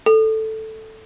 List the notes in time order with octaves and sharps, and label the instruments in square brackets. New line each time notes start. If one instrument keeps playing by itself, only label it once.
[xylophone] A4